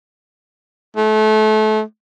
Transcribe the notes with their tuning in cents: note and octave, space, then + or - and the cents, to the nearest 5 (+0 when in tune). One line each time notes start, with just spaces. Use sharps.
A3 -30